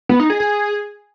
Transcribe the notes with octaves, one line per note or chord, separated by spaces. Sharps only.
B3
D#4
G#4
G#4